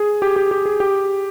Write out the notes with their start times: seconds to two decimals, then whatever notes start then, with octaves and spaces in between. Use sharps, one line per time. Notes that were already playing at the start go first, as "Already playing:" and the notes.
Already playing: G#4
0.22 G4
0.36 G4
0.51 G4
0.66 G#4
0.80 G4